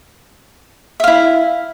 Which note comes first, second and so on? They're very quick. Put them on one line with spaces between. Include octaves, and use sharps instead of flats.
E5 F5 E4